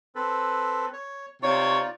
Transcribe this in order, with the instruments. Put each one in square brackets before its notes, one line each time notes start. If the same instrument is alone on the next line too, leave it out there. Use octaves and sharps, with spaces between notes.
[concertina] C4 A4 B4
C#5
[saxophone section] C3 C#5 [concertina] D#4 F4 D5